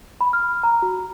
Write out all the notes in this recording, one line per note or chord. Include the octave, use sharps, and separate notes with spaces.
B5
F6
A#5
F#4